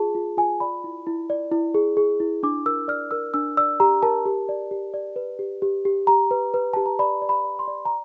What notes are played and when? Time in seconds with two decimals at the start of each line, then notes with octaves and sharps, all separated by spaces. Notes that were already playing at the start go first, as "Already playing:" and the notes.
Already playing: F4 G#4 A5
0.15 F4
0.37 F4 G#5
0.60 D5 B5
0.84 E4
1.07 E4
1.30 D5
1.52 E4
1.74 G#4
1.97 G#4
2.20 E4
2.43 D4 D6
2.66 A#4 E6
2.88 D5 F6
3.11 A#4 E6
3.34 D4 E6
3.57 D5 E6
3.80 G4 A#5
4.03 A#4 A5
4.26 G4
4.49 D5
4.71 G4
4.94 D5
5.16 B4
5.39 G4
5.62 G4
5.85 G4
6.07 G4 A#5
6.31 B4
6.54 B4
6.73 G4 A5
6.86 A#5
6.99 D5 B5
7.22 D5
7.29 B5
7.44 D5
7.59 C6
7.68 D5
7.85 A#5